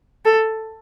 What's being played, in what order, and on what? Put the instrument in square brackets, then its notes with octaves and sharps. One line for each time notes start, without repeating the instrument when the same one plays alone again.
[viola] A4